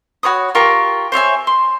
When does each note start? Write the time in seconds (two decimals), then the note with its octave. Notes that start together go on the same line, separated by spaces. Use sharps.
0.23 F#4 C#5 B5 D#6
0.55 F4 G4 A#4 C#6
1.12 C5 C#5 E5 G#5
1.47 C6